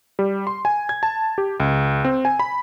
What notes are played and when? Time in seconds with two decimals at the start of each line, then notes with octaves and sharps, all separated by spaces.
0.19 G3
0.47 C6
0.65 G#5
0.89 G#6
1.03 A5
1.38 G4
1.60 C#2
2.05 C4
2.25 G#5
2.39 B5